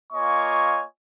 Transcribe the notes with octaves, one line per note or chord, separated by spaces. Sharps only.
A#3 F4 C#5 D#5 G#5 C#6